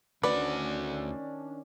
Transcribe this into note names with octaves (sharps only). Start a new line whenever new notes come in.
D2 D#3 C#4 D4 F#4 B4 D5